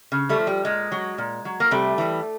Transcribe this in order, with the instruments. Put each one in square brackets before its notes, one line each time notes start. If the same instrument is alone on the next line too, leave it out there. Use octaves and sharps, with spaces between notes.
[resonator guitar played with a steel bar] C#3
G3 A3
F3
G3
A#2 G#3
F#3
A#2
F#3
A#3
C3 G3 A3
E3 G3